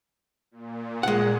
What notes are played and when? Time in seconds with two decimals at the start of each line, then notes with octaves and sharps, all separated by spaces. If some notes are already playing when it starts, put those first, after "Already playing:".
0.51 A#2
1.03 G#3 F#5